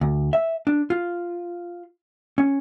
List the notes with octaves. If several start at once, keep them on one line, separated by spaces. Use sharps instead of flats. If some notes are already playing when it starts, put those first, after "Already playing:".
D2
E5
D4
F4
C#4